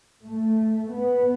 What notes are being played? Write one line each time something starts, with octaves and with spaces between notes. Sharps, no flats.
A3
B3